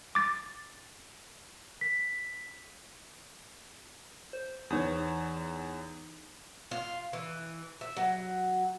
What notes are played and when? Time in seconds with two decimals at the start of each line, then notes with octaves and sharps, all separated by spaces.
0.15 D6 A6
1.81 B6
4.33 C5
4.70 E2 E3 D#4 C#5 D#6
6.71 F4
7.13 E3
7.81 E5
7.97 F#3